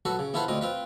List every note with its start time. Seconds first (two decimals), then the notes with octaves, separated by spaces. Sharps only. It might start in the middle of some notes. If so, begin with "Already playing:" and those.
0.05 F#3 F#4 A4 B4
0.19 C#3
0.34 B3 E4 F4 A4 B4 C5
0.48 D2 C4 F4 D#5
0.61 C4 F4 B4